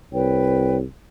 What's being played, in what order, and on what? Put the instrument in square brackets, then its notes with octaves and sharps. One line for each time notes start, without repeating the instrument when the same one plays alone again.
[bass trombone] C2 [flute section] B4 C#5 G5